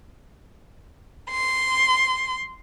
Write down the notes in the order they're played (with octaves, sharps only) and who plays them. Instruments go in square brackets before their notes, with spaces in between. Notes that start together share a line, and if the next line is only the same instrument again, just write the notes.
[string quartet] C6